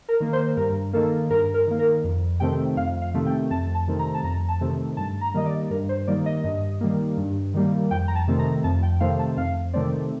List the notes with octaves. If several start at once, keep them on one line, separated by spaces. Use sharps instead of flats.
A#4
D#3 A#3
C5
G2 A#4
D#3 A#3 A4
G2 A#4
A#4
D#3 A#3
A#4
F2
C3 D#3 A3 C4 G5
F2 F5
F5
C3 D#3 A3 C4
G5
F2 A5
A5
C3 D#3 A3 C4
A#5
A5
F2 A#5
A5
C3 D#3 A3 C4
G2 A5
A#5
D#3 G3 A#3 D#5
D5
G2 A#4
C5
D#3 G3 A#3 D5
D#5
G2
D#3 G3 A#3
G2
D#3 G3 A#3
F2 G5
A#5
A5
C3 D#3 A3 C4
A#5
F2 A5
G5
C3 D#3 A3 C4 F5
A5
F2 F5
C3 D#3 A3 C4 D5